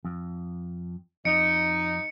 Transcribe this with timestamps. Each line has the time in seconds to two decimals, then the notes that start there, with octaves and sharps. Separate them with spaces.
0.05 F2
1.25 F2 D#4 C#7 D7